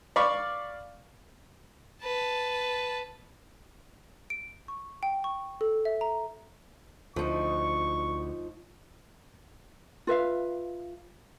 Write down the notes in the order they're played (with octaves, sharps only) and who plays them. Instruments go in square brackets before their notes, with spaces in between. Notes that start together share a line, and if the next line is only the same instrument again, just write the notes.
[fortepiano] D5 F5 B5 C#6
[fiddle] B4 A5
[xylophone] D7
C#6
G5
C#6
A4
E5
A#5
[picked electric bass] D2 [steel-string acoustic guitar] F3 D#4 [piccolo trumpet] C#6
[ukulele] F4 B4 E5 F5